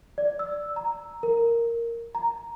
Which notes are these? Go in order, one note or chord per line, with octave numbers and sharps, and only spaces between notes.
D5
E6
A#5
A#4
A#5